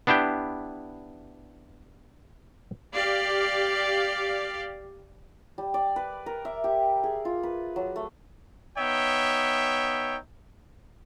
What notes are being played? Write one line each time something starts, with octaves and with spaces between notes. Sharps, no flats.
B3 D4 E4 G4 G5
G4 D5 F5
G3
D5
B4
A#4
E5
G4
G#4
F4
B4
F#3
A3
B3 D#4 C#5 E5 G5